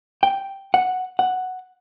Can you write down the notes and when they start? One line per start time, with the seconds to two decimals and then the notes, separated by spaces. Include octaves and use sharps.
0.23 G5
0.74 F#5
1.19 F#5